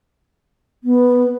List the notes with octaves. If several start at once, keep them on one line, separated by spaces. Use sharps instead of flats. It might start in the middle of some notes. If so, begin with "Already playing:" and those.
B3